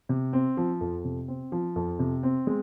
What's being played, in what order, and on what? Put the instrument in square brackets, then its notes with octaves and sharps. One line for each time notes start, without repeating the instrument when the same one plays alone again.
[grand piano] C3
C4
F3
F2
C3
C4
F3
F2
C3
C4
G#3